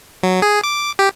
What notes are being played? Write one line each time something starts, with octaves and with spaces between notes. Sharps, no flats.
F#3
G#4
D6
G4